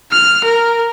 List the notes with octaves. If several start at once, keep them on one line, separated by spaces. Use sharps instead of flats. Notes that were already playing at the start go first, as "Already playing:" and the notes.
F6
A#4